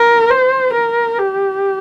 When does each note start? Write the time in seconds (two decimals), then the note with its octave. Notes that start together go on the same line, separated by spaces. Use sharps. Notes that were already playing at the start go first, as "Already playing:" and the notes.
Already playing: A#4
0.30 C5
0.74 A#4
1.19 G4